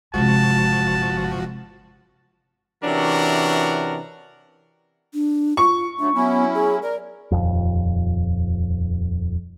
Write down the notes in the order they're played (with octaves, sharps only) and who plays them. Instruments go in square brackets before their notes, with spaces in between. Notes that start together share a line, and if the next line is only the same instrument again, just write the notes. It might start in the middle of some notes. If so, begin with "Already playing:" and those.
[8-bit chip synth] G1 F3 F#4 [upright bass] C3 G#3 [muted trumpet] A5
[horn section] C3 E3 C#4 D4 F#4 A#4
[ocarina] D4
[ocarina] F4 [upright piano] C#6
[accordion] F#3 A3 [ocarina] D4
[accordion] F#3 C#4 E4 [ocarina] B3
[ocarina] G#4
[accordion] A#4 [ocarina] D5
[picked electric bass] D#1 G#1 F2